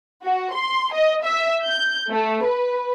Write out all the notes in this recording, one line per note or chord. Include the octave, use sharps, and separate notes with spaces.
F#4
C6
D#5
E5
G6
A3
B4